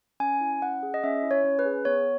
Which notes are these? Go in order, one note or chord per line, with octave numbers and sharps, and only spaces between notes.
C#4 G#5
E4
C#4 F#5
G#4
D#5
C#4 E5
E4
C#5
C#4
B4
G#4
B3 C#5